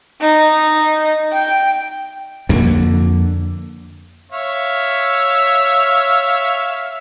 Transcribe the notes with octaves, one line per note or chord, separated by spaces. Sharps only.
D#4
G5
F2 D3 A#3
C#5 E5 F5